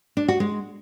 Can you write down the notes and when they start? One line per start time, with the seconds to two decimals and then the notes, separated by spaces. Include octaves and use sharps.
0.17 D4
0.28 F#4
0.40 G#3